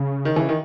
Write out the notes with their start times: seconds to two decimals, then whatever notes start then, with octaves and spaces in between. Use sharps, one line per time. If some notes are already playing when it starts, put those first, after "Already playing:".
Already playing: C#3
0.25 D#3
0.36 C#3 E3
0.49 D#3